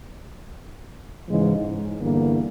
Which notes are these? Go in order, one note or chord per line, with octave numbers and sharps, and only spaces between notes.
G#2 C#3 E3 G#3
G#2
E2 G2 D3 A#3